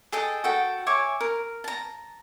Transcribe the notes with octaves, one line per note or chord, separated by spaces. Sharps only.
G#4 A4 D#5 G5
F#4 A4 G5
C#5 E5 G#5 D6
A#4
A5 A#5